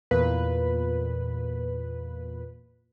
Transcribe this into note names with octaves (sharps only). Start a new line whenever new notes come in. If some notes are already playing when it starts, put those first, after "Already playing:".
E2 A#2 B4